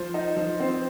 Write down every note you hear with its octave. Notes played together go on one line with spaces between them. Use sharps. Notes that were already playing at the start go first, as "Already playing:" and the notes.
Already playing: F3 C5
D#4
F3
C4